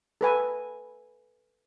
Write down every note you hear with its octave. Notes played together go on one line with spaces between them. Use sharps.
A4 B4 G#5